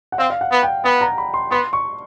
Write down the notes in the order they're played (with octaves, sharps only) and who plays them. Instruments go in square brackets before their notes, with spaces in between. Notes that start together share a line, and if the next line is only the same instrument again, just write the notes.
[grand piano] F#5
[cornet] C4 [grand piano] F5
[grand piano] F5
F#5
[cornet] B3
[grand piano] G5
[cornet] B3 [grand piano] F#5
[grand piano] A#5
B5
C6
[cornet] B3 [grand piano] C6
[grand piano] C#6